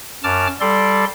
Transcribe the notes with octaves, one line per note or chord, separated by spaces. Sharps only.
F#2 A5 D6 F6
G3 A4 D5 C6